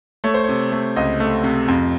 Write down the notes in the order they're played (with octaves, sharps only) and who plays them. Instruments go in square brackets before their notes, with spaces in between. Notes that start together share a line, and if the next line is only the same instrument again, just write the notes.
[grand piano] A3 C#5
C5
C3 C#5
A3
C#2 D#5
A3
C3
F2